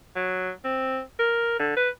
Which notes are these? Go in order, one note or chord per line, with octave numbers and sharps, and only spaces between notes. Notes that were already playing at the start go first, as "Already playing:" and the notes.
F#3
C4
A#4
D3
B4